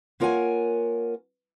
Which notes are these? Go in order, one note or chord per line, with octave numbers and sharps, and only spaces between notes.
A#3 F4 A#4 C#5 F#5 G#5